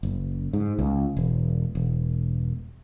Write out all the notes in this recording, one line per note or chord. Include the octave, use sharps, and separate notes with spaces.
F#1
G#2
C#2
E1
E1